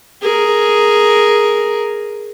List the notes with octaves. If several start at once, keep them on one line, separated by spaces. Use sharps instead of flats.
G#4 A#4